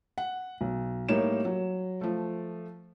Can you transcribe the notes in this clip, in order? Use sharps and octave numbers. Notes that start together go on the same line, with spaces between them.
F#5
B1
A2 G3 A#3 D#4 C#5 E7
F#3
F3 A3